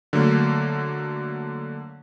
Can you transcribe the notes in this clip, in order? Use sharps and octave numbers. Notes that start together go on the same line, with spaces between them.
D3 F#3 A3 A#3